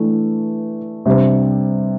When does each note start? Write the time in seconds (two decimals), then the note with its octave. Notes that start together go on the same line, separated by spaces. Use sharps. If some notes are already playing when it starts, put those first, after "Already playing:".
Already playing: E3 A3 D4
1.06 C3 G3 D4 C5